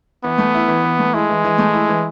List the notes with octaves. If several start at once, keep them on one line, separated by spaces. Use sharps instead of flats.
E3 B3
A3
E4
E3
E3
A3
G#3 E4
E3
E3
A3
E4
E3